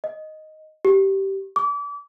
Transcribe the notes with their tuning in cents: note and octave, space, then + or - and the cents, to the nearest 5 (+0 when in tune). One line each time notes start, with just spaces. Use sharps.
D#5 +0
G4 -15
D6 -35